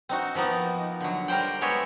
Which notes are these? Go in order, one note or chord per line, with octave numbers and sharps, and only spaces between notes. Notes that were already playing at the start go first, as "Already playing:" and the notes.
C4 D#4 F#4
F3 A#3 B3 D#4
D3 F#3
G3 A#4 C5 G5
G#3 B3 A#4 C#5 E5